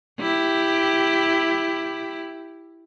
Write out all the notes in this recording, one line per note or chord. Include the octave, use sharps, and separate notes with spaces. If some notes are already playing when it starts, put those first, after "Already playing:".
E4 G4